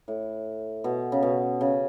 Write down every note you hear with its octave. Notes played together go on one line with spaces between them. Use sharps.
A2
B2
C#3
B2
C#3